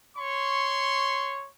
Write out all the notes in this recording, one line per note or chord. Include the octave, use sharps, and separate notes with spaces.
C#5 C6 C#6